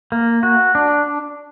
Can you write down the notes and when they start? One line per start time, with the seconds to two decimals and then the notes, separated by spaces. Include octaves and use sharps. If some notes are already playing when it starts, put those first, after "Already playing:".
0.12 A#3
0.43 F#4
0.75 D4